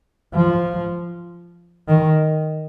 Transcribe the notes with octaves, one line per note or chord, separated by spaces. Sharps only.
F3
D#3